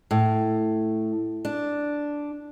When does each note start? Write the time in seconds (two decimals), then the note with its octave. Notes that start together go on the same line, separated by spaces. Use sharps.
0.11 A2
1.45 D4